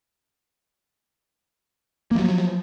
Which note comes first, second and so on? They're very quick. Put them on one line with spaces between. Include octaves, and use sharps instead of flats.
A#3 F3 F#3